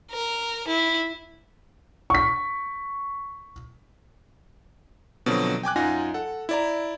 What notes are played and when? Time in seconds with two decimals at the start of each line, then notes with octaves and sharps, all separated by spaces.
0.11 A#4
0.67 E4
2.10 C#6 B6
5.26 B2 D3 F3 F#3 C4
5.63 G5 G#5 D6 F#6
5.76 F#2 D#4 F4 F#5 G#5 A#6
6.14 A4 F#5
6.49 E4 D5 A#5